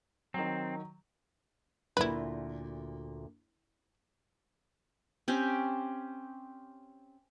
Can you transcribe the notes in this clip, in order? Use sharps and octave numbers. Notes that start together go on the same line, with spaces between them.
D#3 F#3 C4
D2 A#2 A3 E4 B4
C4 C#4 G4